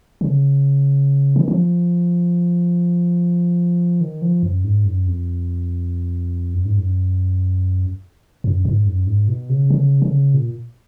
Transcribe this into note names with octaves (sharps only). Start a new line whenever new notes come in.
C#3
D#3
F3
D#3
F3
F#2
G#2
F#2
F2
F#2
G#2
F#2
F#2
G#2
F#2
G#2
B2
C#3
C#3
C#3
A#2